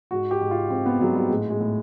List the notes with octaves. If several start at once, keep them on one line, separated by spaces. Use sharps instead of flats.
G#2 F#4
G4
G#2
F4
G#2 C4
B3
G#2 F#3
G3
A2 G#3
G#3
A2